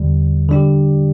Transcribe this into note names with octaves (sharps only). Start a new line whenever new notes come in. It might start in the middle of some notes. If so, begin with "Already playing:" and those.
Already playing: E2 D3 G3
D3 G3 D4 G4